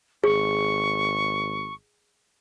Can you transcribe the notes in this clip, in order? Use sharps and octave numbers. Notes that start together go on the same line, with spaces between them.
G#1 G#4 C#6